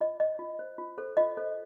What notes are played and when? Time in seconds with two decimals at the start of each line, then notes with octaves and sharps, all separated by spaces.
0.01 F4 D#5
0.20 C5 D#5
0.39 F4
0.59 C5
0.78 F4
0.98 A4 C5
1.17 F4 D#5
1.37 A4 C5